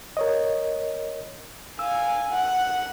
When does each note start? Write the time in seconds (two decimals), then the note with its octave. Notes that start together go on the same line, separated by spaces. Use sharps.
0.17 A#4 C#5 D#5
1.79 F5 G#5 E6
2.30 F#5